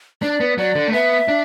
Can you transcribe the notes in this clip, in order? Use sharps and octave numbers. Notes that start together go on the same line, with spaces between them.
D4 D5
B3
F#3 D5
D3
A3
B3 E5
D4